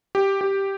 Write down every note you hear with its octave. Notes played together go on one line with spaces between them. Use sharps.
G4
G4